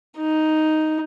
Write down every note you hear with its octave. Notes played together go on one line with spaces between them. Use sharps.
D#4